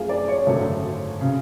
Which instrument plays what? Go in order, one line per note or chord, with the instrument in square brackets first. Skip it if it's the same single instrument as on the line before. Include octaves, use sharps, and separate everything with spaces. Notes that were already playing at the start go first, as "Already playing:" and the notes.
Already playing: [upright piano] F#2 F3 A3 G#4 F5
D5
C#5
G#1 F#2 D3 F#3 A3
C#3